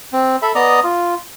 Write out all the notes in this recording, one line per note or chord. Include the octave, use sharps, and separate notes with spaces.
C4
A4 E5 B5
B3 D5 D#5 A#5 D#6
F4